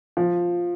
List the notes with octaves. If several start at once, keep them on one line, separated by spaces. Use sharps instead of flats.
F3